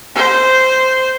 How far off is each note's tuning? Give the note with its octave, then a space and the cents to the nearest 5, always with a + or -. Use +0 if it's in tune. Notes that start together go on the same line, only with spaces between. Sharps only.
C5 -10